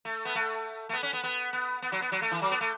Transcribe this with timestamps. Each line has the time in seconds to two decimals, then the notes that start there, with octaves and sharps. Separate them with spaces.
0.05 A3
0.25 B3
0.35 A3
0.89 A3
0.93 B3
1.03 C#4
1.13 B3
1.23 B3
1.53 B3
1.82 B3
1.92 F#3
2.02 B3
2.12 F#3
2.22 A3
2.31 E3
2.42 F#3
2.51 B3
2.61 A3